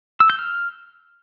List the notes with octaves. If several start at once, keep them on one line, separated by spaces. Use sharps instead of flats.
E6
G6
F6